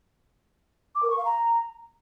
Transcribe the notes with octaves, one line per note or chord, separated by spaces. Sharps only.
D6
A#4
C#6
F5
A#5